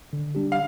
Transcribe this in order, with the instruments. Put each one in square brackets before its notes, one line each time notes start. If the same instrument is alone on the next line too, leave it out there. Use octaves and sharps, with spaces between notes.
[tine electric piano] D3
G3 D4 G4
[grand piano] F5